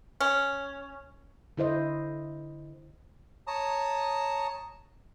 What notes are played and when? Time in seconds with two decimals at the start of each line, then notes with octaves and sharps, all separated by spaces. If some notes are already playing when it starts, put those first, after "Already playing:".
0.21 C#4
1.57 D3 E4 C5 D#5
3.47 C#5 A5 A#5 D#6